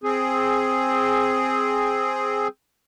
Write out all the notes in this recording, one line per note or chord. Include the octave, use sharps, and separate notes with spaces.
C4 G#4